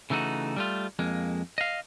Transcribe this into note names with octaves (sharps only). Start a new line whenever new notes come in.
C#3 E3 A3 D#4 F#4
G3 A3 F4
F2 G#3 A#3
D#5 F5